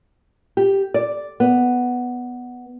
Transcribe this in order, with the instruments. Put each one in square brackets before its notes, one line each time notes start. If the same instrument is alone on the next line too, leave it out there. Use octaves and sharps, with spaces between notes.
[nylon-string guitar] G4
D5
B3